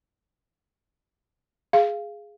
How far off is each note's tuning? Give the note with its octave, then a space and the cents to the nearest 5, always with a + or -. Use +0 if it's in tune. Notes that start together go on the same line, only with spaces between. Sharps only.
G#4 +0 F5 -10